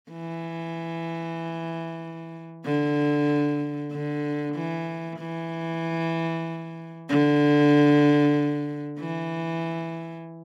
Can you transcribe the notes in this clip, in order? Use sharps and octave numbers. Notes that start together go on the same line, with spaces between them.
E3
D3
D3
E3
E3
D3
E3